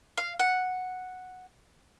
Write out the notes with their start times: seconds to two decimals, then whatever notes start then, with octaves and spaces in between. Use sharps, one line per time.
0.18 F5
0.40 F#5